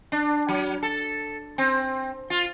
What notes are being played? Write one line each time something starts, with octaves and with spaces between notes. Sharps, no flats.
D4
F#3
A4
C4
F4